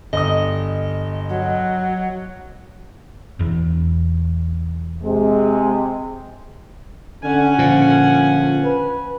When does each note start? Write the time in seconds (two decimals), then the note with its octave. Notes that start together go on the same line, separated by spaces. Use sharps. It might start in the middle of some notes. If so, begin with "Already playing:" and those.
0.13 G1 D#5 D#6
1.29 F#3
3.39 E1 E2
5.03 C3 G#3
7.23 D3 C#4 F#5 G#5
7.59 A#2 D3 F3
8.65 B4